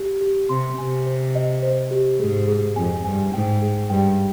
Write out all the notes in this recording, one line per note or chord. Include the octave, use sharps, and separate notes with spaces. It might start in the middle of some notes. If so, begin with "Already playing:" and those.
Already playing: G4
G4
C3 C6
C3 G#5
C5
D#5
C5
G4
G#2 G#4
G#4
F2 G#5
G2 G#5
G#2 G5
G#4
G2 G5